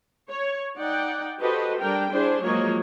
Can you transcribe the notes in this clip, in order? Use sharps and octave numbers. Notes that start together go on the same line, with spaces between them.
C#5
D#4 D5 F#5 G5
F#4 G4 A4 B4 C5 D#5
G3 D4 A#4 G5
D4 E4 G#4 C5
F3 F#3 G#3 A#3 C#5 D#5